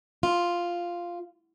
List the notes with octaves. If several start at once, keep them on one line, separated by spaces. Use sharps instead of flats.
F4